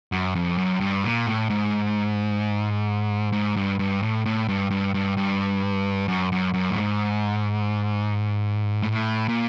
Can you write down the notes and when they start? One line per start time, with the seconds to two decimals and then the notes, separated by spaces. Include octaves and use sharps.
0.12 F#2
0.35 F2
0.58 F#2
0.80 G2
1.04 A#2
1.27 A2
1.50 G#2
3.33 G#2
3.56 G2
3.79 G2
4.03 A2
4.25 A2
4.48 G2
4.71 G2
4.94 G2
5.17 G2
6.08 F#2
6.32 F#2
6.54 F#2
6.70 A2
6.77 G#2
8.83 A2
9.29 A#2